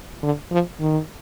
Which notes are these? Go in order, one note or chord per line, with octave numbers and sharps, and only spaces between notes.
D3
F3
D#3